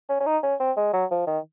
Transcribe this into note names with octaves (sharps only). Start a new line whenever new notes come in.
C#4
C#4
D#4
C#4
C4
G#3
F#3
F3
D#3